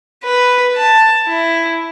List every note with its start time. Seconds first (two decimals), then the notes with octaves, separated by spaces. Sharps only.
0.24 B4
0.76 A5
1.27 E4